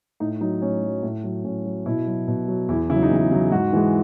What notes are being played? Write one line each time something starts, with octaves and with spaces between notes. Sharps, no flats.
A2 D#4
F#3 D#4
A2 C#4
F#3
A2
F#3
A2 C#4
F#3
B2 E4
F#3
B2
F#3
E2 E4
C#3 F#3 E4
D#4
E2
E4
C#3 F#3
G#2 F#4
E3 G#3